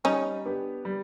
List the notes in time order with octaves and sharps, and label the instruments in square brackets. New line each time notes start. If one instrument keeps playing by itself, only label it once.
[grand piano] G3 [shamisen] C#4 D#4
[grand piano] B3 D4 G4 B4
G3